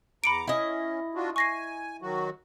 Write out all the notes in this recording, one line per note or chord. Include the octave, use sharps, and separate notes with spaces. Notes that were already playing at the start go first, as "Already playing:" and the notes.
E2 A#5 B5 D6 C#7 D7
C#4 E4 D#5
D4 F4 F#4
G#5 C#6 A#6 C7
D#3 F#3 F#4